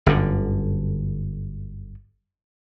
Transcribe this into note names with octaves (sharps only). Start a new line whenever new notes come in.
G1 F#2 D3